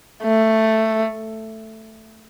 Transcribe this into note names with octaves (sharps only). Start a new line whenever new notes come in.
A3